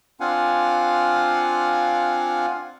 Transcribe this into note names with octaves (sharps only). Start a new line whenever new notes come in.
C4 D4 F4 F5 F#5 G#5